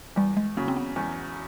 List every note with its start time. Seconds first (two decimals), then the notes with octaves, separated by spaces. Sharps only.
0.16 E2 G3
0.37 G#3
0.57 C#3 F#3 A#3
0.68 C4
0.77 B3
0.96 E2